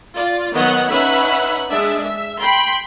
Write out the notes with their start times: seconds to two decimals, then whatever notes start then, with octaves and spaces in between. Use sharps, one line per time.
0.15 F4 D5
0.53 D#3 F#3 B3 C#5 D#5 F#5
0.89 C#4 D#4 B4 E5 F#5 B5
1.71 G#3 D4 E5
2.04 E5
2.39 G5 B5 C6